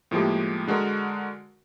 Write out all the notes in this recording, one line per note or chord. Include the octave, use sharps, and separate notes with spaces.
A2 F3 G#3 A#3 G4
D3 G#3 F#4 A#4